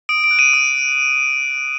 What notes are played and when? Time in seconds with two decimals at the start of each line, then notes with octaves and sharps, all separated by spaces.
0.09 D#6 D7
0.24 D7
0.31 F#6
0.39 D#7
0.53 D#6